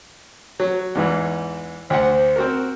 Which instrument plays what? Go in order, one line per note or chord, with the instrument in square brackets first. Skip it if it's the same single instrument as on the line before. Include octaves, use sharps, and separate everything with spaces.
[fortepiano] F#3
E2 G#2 E3
[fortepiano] D2 F#5 [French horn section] C5
[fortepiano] C4 F#4 A#4